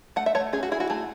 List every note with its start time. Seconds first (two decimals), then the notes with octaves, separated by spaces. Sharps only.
0.16 A3 F#5
0.26 E5
0.35 A3 C#5
0.53 C#4 G#4
0.63 F#4
0.72 E4 G#4
0.80 F#4
0.90 A3 G#4